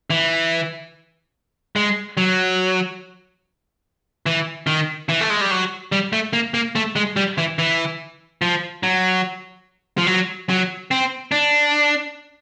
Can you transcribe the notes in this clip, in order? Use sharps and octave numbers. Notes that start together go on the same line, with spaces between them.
E3
G#3
F#3
E3
D#3
E3
A3
G#3
G3
F#3
G3
A3
A#3
A#3
A3
G#3
G3
E3
E3
F3
F#3
F3
F#3
F#3
C4
D4